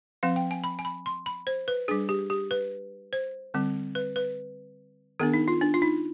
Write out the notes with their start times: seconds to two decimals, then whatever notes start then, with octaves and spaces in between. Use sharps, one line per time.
0.23 F3 C4 F5
0.36 G5
0.51 G#5
0.64 B5
0.79 G#5
0.85 B5
1.06 C6
1.26 B5
1.47 C5
1.68 B4
1.88 G3 D4 G#4
2.09 G4
2.30 G4
2.51 B4
3.13 C5
3.54 D3 G3 C4
3.95 B4
4.16 B4
5.20 D#3 B3 D4 G#4
5.34 D#4
5.48 F4
5.61 D4
5.74 F4
5.82 D#4